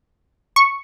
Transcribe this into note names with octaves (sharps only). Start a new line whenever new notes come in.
C#6